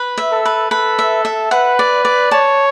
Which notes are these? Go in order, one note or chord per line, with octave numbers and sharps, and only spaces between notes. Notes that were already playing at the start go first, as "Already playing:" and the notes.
Already playing: B4
E5
A4
B4
A4 B4
E5
E5
B4 F#5
D5
D5
C#5 A5